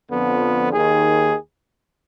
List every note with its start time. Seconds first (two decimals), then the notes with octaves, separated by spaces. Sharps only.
0.11 F2 D3 F3 B3
0.72 D#2 D#3 G#4